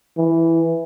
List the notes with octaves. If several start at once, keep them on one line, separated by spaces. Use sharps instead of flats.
E3